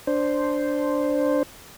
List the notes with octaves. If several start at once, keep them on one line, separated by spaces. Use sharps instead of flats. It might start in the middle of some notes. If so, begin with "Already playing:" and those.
D4 C5